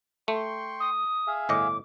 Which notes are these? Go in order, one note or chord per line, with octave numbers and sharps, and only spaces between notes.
A3 G5 C6 C#6
D#6
G#4 E5 F5
G1 A2 D#5 D6